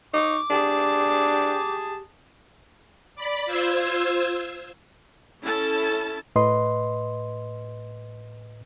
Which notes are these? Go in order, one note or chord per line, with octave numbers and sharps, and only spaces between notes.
D#4 C#6 D6
D4 G4 G#4 A5
D5 B5
F4 C5 E6 G#6
C#4 E4 A4 A5
A2 B4 D#5 C6